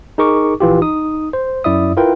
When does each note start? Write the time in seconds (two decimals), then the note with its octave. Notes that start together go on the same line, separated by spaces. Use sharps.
0.18 D#4 G#4 A#4 C#6 D6
0.60 A#1 E3 F4 G4
0.82 D#4 D#6
1.33 C5
1.64 F#2 E4 D5 E5 D#6
1.97 E4 F4 A#4 B4 G5